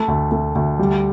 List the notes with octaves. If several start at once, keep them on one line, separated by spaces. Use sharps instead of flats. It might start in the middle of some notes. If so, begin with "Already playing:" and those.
Already playing: A3
D2
A3
D2
G3